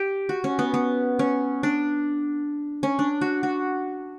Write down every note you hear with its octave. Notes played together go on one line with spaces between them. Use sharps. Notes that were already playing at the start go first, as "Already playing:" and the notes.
Already playing: G4
F#4
C#4
B3
B3
C#4
D4
C#4
D4
F#4
F#4